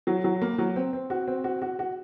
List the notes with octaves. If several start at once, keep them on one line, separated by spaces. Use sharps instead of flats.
F#3
F#3
A#3
F#3
C4
C4
F#4
C4
F#4
F#4
F#4